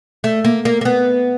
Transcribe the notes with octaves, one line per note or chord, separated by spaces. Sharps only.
A3
A#3
A#3
A#3
B3